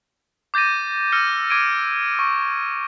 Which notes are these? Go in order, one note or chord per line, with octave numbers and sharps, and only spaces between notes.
D6 G6 A6 A#6 D#7
E6 F6 A#6 C#7 D#7
D6 G#6 D7 D#7
C#6